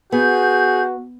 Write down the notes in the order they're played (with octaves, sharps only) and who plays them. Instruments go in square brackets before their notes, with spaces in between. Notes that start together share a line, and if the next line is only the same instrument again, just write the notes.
[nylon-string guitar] B3 [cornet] F#4 [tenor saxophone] G#4 [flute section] G6